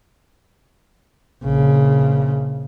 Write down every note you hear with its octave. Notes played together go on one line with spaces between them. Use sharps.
A#1 C#3